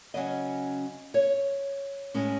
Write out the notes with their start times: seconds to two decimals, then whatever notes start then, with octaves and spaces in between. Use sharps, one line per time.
0.14 C#3 F#3 C#4 D#5
1.14 C#5
2.14 A2 G#3 C#4